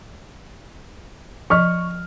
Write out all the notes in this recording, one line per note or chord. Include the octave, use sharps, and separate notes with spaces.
F3 D#5 C#6 F6